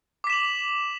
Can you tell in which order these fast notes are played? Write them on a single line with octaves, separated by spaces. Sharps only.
D6 B6 E7 F#7